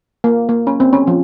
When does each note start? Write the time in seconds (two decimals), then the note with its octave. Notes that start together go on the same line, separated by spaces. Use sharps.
0.24 A#3
0.49 A#3
0.67 C#4
0.80 C4
0.93 C#4
1.07 F3